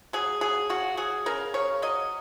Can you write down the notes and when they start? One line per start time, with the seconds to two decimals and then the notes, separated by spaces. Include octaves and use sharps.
0.13 F#3 G#4
0.41 F#3 G#4
0.69 C#3 F#4
0.97 F#3 G#4
1.26 C#3 A#4
1.54 C#3 C#5
1.82 F#3 D#5